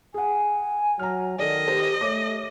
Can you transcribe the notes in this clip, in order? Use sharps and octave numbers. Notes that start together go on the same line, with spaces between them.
G#4 F#5 G#5
F#3 A#5 F6
D#3 A4 D5 D#5
G4 C5
A3 C#5 D6